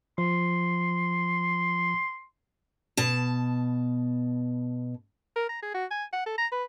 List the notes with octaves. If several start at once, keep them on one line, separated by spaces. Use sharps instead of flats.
F3 C6
B2 A5
A#4
A#5
G#4
F#4
G#5
F#5
A4
A#5
B4